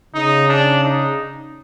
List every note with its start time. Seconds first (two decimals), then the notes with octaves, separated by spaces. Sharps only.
0.14 C#3 D#4
0.49 D4
0.84 D#4